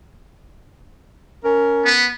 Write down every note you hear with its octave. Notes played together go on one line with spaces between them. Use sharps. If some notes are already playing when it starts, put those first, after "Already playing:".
C#4 A#4
B3